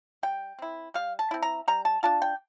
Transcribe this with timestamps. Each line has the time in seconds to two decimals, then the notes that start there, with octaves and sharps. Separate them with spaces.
0.23 G3 G5
0.59 C4 E4
0.94 G3 F5
1.19 A5
1.31 C4 E4
1.42 A#5
1.68 G3 A#5
1.85 A5
2.03 D4 F4 A5
2.22 G5